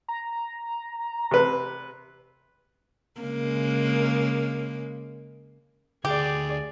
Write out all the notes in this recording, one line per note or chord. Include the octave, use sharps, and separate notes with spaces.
A#5
C3 B4
C#3 G#3 A#3
D2 G4 G#4 D5